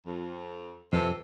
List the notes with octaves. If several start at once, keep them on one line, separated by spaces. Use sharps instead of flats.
F2
F2 C3 E3 A4